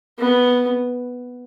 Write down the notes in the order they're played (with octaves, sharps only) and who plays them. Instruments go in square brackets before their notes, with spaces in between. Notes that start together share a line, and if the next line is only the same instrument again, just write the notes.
[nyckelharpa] B3